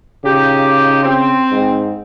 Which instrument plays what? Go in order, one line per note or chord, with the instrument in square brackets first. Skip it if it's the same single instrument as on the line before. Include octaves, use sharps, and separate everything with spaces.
[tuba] C#3 [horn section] D#4 F4 G4
[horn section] C4
[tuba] G#2